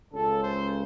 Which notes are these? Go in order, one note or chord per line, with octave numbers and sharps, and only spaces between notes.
C#2 C#3 A4
C5